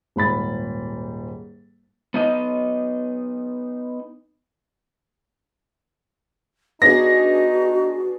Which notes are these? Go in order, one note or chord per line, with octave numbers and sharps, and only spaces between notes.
D#1 G#2 B5 A6
B3 D#4 D#5
B3 D4 D#4 F#4 G#4 A#6